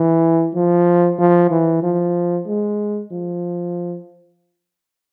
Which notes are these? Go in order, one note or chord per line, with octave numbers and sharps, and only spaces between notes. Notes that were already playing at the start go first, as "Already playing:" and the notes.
Already playing: E3
F3
F3
E3
F3
G#3
F3